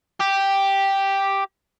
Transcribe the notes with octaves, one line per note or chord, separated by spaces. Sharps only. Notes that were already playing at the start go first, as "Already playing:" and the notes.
G4